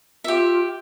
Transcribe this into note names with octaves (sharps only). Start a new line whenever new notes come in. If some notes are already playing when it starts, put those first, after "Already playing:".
F4 G4 E5